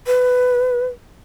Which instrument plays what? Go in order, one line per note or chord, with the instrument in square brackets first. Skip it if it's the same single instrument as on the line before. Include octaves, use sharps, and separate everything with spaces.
[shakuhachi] B4